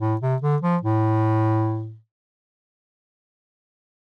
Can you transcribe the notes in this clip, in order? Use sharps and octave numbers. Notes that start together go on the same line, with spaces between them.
A2
C3
D3
F3
A2